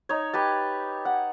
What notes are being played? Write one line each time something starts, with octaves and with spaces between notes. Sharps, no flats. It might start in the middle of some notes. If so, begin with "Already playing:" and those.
D#4 C#5
G4 B4 A5
F#5